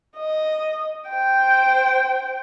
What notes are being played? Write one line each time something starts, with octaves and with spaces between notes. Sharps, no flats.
D#5
C5 G5